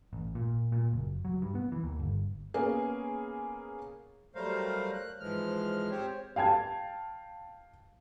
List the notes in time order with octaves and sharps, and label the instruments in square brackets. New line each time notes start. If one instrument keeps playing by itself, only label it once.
[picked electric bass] A1
A#2
A#2
F#1
F#3
G2
B3
E3
D#2
G1
[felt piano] A#3 B3 C#4 G#4
[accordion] F#3 G3 A3 A#4 C5 F5
F#6
G#2 E3 F3 G#3 F6
C4 G4 C5 C#5
[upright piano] F5 G5 A5 G#6